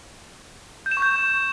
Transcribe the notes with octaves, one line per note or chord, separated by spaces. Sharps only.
G6
E7
C#6
G6